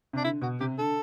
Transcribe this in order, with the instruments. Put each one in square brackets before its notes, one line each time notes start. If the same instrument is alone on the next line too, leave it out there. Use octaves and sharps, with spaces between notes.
[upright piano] C3 [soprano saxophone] D4
[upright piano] D3 [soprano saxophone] E4
[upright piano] B2 [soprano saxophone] F#4
[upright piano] C3 [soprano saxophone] G4
[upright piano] D3 [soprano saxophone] A4